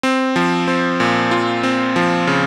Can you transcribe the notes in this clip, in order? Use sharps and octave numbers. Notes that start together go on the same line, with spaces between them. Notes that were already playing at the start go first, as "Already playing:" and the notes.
C4
F3
C4
A#2
F4
C4
F3
C#3